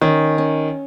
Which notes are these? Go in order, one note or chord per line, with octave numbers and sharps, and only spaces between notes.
D#3 C#4
C#4